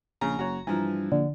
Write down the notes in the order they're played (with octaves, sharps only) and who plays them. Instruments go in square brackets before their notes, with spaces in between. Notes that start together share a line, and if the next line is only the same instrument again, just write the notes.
[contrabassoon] A#1 [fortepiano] C#3 [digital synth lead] A#5
[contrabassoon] F#1 [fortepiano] F#4 C#5
[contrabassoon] G2 [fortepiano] E3 F3
[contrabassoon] A#1 [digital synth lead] D3